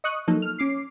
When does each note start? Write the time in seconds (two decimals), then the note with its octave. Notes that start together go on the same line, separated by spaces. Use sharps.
0.04 D#5 C#6 D#6 F#6
0.28 F3 F#3 A#3 D#4 A4
0.42 F6
0.59 C#4 D6 C7